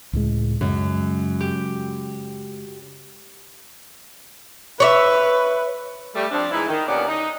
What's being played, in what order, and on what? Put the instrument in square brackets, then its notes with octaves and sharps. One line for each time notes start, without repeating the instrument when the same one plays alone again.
[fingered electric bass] C#2 A2 G#3
[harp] F#2 [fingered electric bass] C#3 G#3
[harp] G4
[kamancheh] B4 [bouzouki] C#5 D5 E5
[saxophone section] G3 A3
F3 C4 D4
G#2 E3 D#4 E4
D#3
D#2 A#2 D3 B3 C#4 D5
D#4